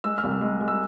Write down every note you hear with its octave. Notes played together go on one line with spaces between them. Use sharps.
G#3 E6
F6
C2
E6
G#3
G#3
E6